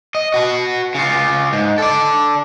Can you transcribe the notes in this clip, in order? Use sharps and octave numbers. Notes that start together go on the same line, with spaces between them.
D#5
F#4 B4
C#3 F4
G#2
A4 D5